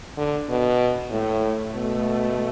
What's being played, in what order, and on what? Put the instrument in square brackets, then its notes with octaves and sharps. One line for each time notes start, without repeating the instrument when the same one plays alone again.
[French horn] D3
B2
[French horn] A2 [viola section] A3
[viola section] A3
[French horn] B2